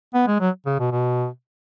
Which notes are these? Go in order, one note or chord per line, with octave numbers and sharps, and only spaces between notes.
B3
G#3
F#3
C#3
B2
B2